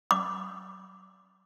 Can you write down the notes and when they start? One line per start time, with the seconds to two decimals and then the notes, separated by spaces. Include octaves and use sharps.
0.11 D6